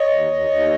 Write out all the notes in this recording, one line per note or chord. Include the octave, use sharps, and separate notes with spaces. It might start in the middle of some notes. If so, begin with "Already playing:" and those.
Already playing: C#5 D#5
D#2
D#2
D#2